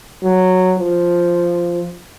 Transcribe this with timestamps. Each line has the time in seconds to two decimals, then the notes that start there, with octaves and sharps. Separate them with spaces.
0.23 F#3
0.79 F3